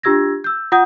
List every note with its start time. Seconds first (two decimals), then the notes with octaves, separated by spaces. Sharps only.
0.03 D4 F4 G4 E6 G#6 A#6
0.44 E6 G6
0.72 F4 F#5 D#6 G6